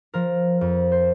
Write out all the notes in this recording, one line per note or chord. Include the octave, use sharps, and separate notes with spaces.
F3 A#4
F2
C5